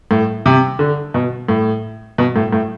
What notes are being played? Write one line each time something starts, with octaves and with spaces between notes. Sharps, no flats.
A2
C3
D3
B2
A2
B2
A2
A2